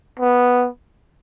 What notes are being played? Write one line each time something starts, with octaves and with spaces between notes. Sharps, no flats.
B3